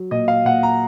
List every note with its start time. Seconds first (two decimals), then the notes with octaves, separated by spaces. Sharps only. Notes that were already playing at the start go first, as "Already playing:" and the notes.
Already playing: F#3
0.11 A#2 D#5
0.28 F5
0.45 A#2 F#5
0.63 A#5